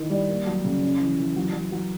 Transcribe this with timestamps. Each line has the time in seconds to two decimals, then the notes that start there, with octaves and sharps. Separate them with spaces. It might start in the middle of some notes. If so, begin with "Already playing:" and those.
Already playing: D#3 E4
0.10 G3
0.29 A#3
0.47 F#3
0.64 C#3
0.82 C#4
1.00 E3
1.18 E3
1.36 F#3
1.53 F#3
1.72 F#3